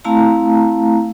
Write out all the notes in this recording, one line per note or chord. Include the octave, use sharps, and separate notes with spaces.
A3 C4 E4 F5 A5 A#5